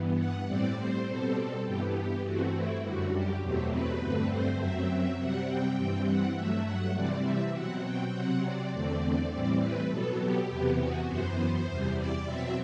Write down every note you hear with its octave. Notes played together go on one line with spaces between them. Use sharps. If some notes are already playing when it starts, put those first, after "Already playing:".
Already playing: G2 E3 B3
F#5
A2 G3 C4 D5
C5
B2 G3 C4 A4
A4
G2 E3 B3 G4
G4
G2 E3 A3 C4 F#4
E4
F#2 D3 G3 F#4
G4
E2 B2 F#3 A3 C4 G4
B4
G2 D3 A3 C4
C5
F#2 F#3 C4 E5
E5
C3 G3 C4 F#5
G5
G2 E3 G3 C4
F#5
G2 F#3 A3 E5
F#5
C3 E3 G3 C4 D5
E5
B2 F#3 C4 F#5
G5
C3 F#3 C4 F#5
D5
E2 D3 A3 C4 D5
A2 E3 G3 C4 D5
B4
B2 F#3 B3 A4
G4
E2 C3 E3 B3
F#4
F#2 E3 B3 C5
E2 C3 E3 G3
D5
B2 F#3 C4 E5